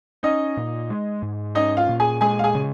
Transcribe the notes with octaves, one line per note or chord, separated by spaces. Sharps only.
C#4 D#4 D#5
A#2
G#3
G#2
C#4 D#4 D#5
F4 F5
A#2
G#4 G#5
G#3 G#4 G#5
F5
G#4 G#5
C#3